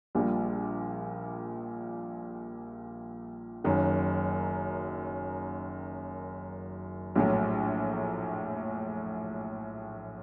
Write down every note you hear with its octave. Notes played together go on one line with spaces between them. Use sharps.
A#1 A#2 G3
F#1 F#2 D#3 F#3
A#1 A2 F#3